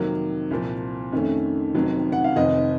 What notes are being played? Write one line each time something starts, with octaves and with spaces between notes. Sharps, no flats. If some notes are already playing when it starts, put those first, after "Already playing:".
Already playing: F2 C3 D#3 F#3 A#3
C2 A#2 F3
F2 D#3 A3 C#4
F1 F2 C3 D#3 F#3
F#5
F5
F1 F2 D#3 D#5